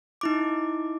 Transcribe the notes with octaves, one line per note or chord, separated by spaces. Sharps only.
D#4 E4 D6